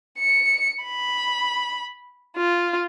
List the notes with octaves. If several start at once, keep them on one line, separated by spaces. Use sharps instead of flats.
C#7
B5
F4